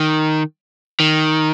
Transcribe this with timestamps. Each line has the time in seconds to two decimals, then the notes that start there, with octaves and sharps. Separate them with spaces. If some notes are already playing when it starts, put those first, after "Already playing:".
Already playing: D#3
1.00 D#3